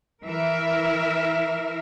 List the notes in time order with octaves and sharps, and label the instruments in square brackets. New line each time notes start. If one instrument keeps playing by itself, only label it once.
[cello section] E3 A#4 E5